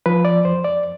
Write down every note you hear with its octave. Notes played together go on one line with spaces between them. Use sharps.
F3 B4
D5
F2 C5
D5